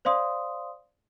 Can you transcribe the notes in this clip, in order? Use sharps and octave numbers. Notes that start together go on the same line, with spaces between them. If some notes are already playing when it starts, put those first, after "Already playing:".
C5 D5 F5 C6 D#6